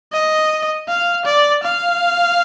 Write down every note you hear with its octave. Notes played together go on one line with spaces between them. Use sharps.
D#5
F5
D5
F5